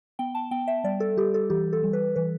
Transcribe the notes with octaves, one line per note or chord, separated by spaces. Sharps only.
B3 G5
A5
B3 G5
E5
G3 D5
A4
G3 G4
A4
E3 G4
A4
G3
B4
E3 B4